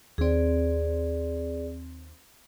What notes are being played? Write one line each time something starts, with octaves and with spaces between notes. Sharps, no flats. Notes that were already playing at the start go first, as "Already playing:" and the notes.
D#2 C4 G#4 D5